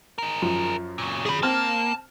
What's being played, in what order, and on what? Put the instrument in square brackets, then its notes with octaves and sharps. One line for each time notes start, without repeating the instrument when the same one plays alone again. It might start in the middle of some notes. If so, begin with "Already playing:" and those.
[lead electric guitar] G#4 A#4
[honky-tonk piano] F#2 F3
[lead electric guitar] A#2 C#3
[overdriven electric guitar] G#4 B5
[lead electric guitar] A#3 [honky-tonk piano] C4 F6 [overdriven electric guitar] A5